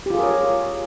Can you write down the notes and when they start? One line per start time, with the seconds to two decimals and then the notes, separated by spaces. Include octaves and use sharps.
0.06 G4
0.10 F4
0.15 G#4
0.19 A#4
0.23 C#5